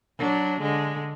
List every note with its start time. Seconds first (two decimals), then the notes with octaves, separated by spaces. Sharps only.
0.18 F#3 D4
0.60 D3 G#3